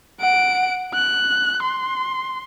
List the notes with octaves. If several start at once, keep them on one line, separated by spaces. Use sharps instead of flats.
F#5 D7
F#6
C6